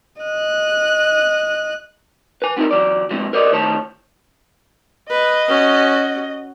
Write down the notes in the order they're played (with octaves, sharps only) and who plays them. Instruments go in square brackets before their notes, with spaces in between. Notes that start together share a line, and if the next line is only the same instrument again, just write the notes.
[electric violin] D#5 F#6
[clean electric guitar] B4 G#5
B3 C4 D#4 E4 A#4
E3 F#3 D5
F3 G#3 C4 E4
A#4 C5 D5 D#5
A2 D#3 C5 C#5 A5
[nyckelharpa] B4 [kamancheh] D#5
[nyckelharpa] C#4 F#4